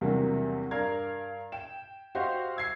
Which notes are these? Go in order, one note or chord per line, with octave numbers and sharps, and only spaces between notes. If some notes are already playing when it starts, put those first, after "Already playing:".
E2 C3 F#3 G3 A#3 D4
G2 A#4 D5 F5 A#5 G#6
G5 E7
F#4 G4 C5 D#5 F5
E6 G#6 C7